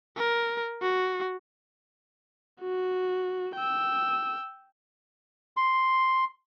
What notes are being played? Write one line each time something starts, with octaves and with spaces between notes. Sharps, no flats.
A#4
F#4
F#4
G5 E6
C6